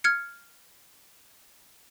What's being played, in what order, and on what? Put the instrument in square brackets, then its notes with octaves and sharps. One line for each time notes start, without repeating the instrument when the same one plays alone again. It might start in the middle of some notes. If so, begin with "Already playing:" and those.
[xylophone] F6 G#6 C#7